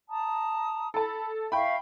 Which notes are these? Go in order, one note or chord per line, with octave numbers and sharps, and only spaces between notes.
A5 A#5 D#6
A4 A5 B5
E5 F5 G5 B5 C#6